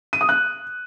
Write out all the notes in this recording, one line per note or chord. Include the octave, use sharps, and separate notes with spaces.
D#7
D#6
F#6